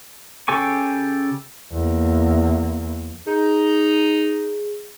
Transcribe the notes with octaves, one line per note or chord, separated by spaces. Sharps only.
C#3 G4 A4 G#5 C#6
E2 A#3
D#4 G#4